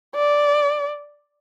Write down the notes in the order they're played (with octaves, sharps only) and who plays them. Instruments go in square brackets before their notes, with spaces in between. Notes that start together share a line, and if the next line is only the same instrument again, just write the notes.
[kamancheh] D5